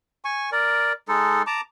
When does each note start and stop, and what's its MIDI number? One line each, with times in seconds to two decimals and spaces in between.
0.25 0.50 80
0.25 0.50 85
0.52 0.93 70
0.52 0.93 74
1.08 1.42 56
1.08 1.42 63
1.08 1.42 69
1.47 1.61 81
1.47 1.61 82
1.47 1.61 86